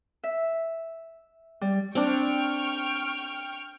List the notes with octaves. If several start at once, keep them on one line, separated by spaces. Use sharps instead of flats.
E5
G3
C4 D4 G5 C#6 F6